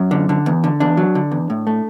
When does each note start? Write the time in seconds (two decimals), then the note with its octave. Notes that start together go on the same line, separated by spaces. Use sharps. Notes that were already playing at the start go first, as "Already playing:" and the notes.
Already playing: F#2
0.11 D3
0.29 D3
0.46 E2
0.64 D3
0.80 E2 D4
0.97 F#3
1.15 D3
1.31 E2
1.50 A2
1.67 A3